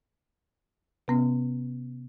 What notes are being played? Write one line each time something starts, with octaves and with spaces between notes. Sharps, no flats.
C3 B3 C#4